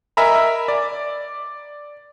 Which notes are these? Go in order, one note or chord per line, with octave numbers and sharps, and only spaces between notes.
A#4 D#5 E5 G#5 A#5 B5
D5